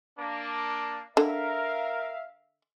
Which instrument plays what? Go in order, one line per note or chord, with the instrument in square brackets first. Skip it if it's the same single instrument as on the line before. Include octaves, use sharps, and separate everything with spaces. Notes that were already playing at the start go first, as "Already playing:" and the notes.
[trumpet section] A#3 D4
[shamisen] D3 [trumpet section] A#4 [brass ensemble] E5 F5